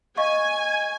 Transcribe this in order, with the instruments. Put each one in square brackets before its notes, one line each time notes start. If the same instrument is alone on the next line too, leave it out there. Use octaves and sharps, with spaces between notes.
[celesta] D#5 F5 C#6 [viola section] G#5